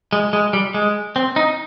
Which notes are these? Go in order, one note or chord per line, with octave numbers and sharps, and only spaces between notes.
G#3
G#3
G3
G#3
C4
D#4